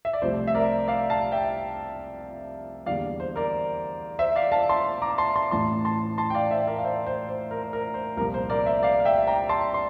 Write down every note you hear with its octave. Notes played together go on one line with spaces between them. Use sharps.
E5
D5
C2 C3 F3 A3 C4 C5
E5
A#4 D5
D5 F5
F5 A5
E5 G5
E2 D3 G3 A#3 D5 F5
C5
A#4 D5
C5 E5
D5 F5
F5 A5
A5 C6
A#5 D6
A5 C6
A5 C6
A1 A2 E3 A3 A5 C6
A5 C6
A5 C6
G5
D5 F5
C5 E5
A#4 D5
F5
C5 E5
C5
C5
A#4
C5
A#4
C5
C2 A#2 F3 A#3 A#4
C5
A#4 D5
C5 E5
D5 F5
F5
E5 G5
G5 A#5
A5 C6
C6